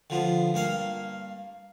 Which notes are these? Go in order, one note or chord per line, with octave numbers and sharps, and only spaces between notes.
D3 F3 B3
G2 A#3 F5